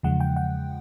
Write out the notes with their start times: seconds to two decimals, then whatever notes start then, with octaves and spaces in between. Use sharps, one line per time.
0.03 E2 C#3 F3 G#3 F#5
0.20 G5
0.36 F#5